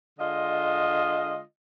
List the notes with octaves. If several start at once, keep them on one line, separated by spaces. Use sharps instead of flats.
D3 G#3 F4 D#5